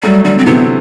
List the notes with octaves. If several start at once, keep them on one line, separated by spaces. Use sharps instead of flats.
F#3 G3 A3
D3 F#3 G3
C4
C3 E3 B3